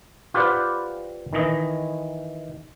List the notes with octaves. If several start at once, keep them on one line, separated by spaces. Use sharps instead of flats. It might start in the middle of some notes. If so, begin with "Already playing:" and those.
F4 G4 B4 C5 D5 F#5
D#3 E3 D#5